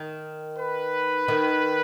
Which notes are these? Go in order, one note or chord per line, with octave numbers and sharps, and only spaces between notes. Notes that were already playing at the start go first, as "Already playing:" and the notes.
Already playing: D#3
B4
D#3